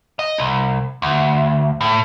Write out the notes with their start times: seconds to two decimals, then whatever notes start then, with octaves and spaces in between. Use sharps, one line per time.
0.19 D#5
0.38 C2
1.02 D2
1.81 A2